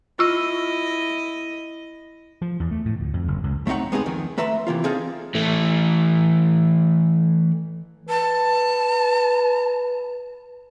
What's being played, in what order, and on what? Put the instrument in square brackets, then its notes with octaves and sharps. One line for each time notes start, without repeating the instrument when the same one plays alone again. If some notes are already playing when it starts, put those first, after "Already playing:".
[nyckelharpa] E4 D#5 [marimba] F4 C#6 E6
[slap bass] F3
E2
A3
A2
D2
F2
F#1
C#2
[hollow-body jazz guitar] A3 C4 D#4 C#5 F#5
G#3 B3 C4 D#4 G#4
F2 D#3
A3 B4 E5 A#5 C6
C3 E3 A#3 F4
C4 D4 D#4 G#4 A4 F5
[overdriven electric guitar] E3 A3
[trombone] B4 [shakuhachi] A5